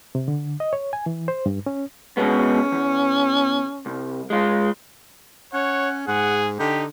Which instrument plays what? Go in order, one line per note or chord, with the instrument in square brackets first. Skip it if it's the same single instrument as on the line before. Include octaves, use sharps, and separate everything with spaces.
[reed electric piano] C3
D3
D#5
C#5
G#5
E3
C5
G2
C#4
[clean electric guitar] B2 G#3 B3 [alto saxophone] C#4
[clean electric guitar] E2
C2
G#3 F4
[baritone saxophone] C#4 [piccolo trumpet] C#5 [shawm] F#5
[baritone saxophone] G#2 [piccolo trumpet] G#4 [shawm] F#5
[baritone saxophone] D3 [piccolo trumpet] D#4 [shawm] G4